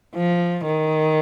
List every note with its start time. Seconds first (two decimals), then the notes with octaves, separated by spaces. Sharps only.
0.15 F3
0.66 D#3